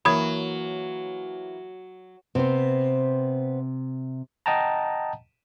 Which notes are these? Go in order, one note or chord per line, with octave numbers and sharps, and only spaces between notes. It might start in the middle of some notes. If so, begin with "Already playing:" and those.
E3 F#3 A#3 B5 D#6 G#6
C3 B3 C4 C5
D#5 F#5 G5 A5 A#5